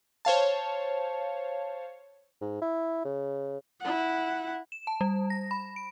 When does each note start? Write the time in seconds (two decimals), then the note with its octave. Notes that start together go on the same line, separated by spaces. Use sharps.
0.25 C5 C#5 F5 A5
2.41 G#2
2.62 E4
3.05 C#3
3.80 E4 F#5
4.72 E7
4.87 A5
5.01 G3
5.30 A#6
5.51 B5
5.76 D7